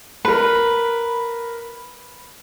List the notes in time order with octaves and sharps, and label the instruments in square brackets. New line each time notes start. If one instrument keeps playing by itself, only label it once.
[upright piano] A#4 B5 [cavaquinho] B4